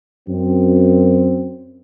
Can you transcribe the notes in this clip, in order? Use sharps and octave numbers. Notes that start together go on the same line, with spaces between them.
F#2 C4